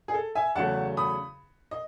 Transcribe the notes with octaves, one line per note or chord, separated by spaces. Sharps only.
G#4
A4
E5 G#5
E2 C#3 F#3 A3 C#4 F#5 A5
B5 D#6
D#5